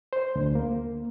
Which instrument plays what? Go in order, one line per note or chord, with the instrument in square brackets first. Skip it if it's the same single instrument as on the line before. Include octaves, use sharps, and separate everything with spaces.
[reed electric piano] C5
D2
A#3